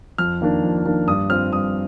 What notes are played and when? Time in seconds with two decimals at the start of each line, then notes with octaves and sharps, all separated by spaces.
0.18 F2 F6
0.41 D#3 A#3 D4
0.63 F2
0.86 D#3 A#3 D4
1.08 G2 D#6
1.30 F3 C4 F6
1.52 G2 D#6